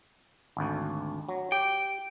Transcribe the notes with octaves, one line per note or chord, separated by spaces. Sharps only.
G#1 D2
F#3
G4 G5